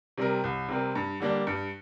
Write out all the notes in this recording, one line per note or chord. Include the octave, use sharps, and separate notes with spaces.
C3 G3 C4 A#4
C2
C3 G3 C4 A#4
G2
D3 G3 A#3 D4
G2